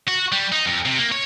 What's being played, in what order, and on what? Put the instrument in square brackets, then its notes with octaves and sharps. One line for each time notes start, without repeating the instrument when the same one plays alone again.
[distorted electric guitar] F#4
G3
D#4
F2
C3
A#3
C#5